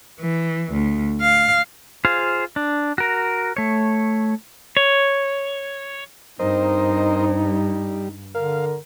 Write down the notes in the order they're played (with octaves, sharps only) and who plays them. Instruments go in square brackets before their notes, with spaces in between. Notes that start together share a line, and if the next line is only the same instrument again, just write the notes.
[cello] E3
D2
F5
[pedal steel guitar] F4 G#4 C5 F5
D4
F#4 A#4
A3 C#5
C#5
[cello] G2 [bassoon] C4 [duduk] D#4 [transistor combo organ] A#4 C5 D#5
[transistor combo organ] G3
[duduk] D3 [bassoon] A#4 [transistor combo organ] F5